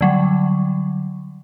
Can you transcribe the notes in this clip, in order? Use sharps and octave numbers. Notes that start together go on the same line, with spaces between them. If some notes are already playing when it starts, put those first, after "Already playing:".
D3 F#3 G3